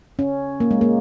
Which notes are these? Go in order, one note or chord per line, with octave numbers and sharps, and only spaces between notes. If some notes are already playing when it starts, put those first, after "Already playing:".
C#4
A#3
G#3
A#3